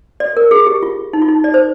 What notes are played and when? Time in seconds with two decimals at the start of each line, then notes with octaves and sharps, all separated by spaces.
0.20 D5
0.37 A#4
0.51 G#4
0.67 G4
0.83 F4
1.13 D#4
1.22 F4
1.28 D#4
1.44 D5
1.54 C5